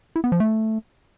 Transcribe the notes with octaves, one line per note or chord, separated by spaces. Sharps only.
E4
B3
F3
A3